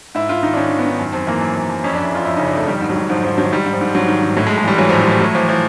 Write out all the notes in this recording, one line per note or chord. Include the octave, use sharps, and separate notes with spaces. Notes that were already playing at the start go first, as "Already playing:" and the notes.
G#2 E4
G#2 F4
D#3 D#4
D4
D#3 C#4
D#3
B3
D#3
F#2
F#2 C4
E3 A#3
F#2
F#2
F#2
F2 C#4
D4
F2
E4
F2 F4
F2 E4
C#3 D#4
D4
F2 A3
D#3 G3
G#2
F#3
G#2
G#2 F3
G#2 F3
D#3 F#3
G#2 G3
G#2
F3
G#2
G#2 F#3
D#3
G#2
A2 F#3
G#3
A2
G#3
E3 G3
E3 F#3
F3
A2
F#3
A2 G3
A2 F#3
E3 F3
E3 F3